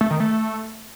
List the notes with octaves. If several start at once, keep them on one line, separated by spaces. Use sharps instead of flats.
A3
D#3
A3